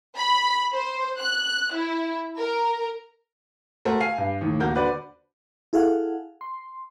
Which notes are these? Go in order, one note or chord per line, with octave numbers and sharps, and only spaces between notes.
B5
C5
F#6
E4
A#4
A3 F#4 A#4 C5
F5 G#5 C7
G2
D#2 A2
D#1 A#3 F#4 A#4 G6
D3 F#4 B4 C5 D5
E4 G#4 A4 F5 F#5
C6